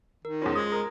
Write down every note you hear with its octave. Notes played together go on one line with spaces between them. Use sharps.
D#3 A#4
E2 C#4 F4 C5 C6
G#3 D#6
A#4 A#5 D#6